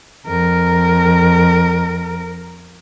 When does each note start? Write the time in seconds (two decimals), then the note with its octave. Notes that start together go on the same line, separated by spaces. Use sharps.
0.27 F2 A#4